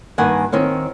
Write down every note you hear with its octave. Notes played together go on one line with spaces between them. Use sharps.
G2 D#3 A#3 F#5 G#5
D#3 C4 C#5 F5